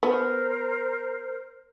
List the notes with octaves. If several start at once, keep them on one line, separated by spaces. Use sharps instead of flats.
B3 A#4 C5